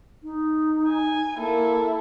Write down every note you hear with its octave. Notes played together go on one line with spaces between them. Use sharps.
D#4
G#5
A#3 E4 A4